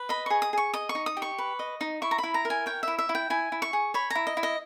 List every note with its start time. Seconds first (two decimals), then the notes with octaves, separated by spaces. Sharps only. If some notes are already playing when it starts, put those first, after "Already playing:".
Already playing: B4
0.09 D#5 B5
0.26 G#4 C#6
0.42 D#6
0.53 G#4 C#6
0.74 D#5 D#6
0.89 C#6
0.95 D#4
1.06 D#6
1.17 G4
1.22 C#6
1.38 B4
1.59 D#5
1.81 D#4
2.02 E4 C#6
2.11 A#5
2.18 B5
2.23 E4
2.34 A#5
2.45 A#4
2.50 G#5
2.66 C#5 G5
2.83 E4 E5
2.98 E5
3.09 E4
3.15 G5
3.30 E4 G#5
3.52 E4
3.62 C#6
3.73 G#4
3.94 C#5 B5
4.10 E4 A#5
4.27 D#5
4.37 E4
4.43 D#5